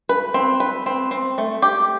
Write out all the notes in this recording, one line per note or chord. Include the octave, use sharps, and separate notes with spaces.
B4
C4
B4
C4
C4
A3
G4